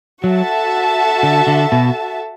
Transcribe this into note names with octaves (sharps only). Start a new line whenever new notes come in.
F#3 F#4 A4 E5 A5
D3
D3
B2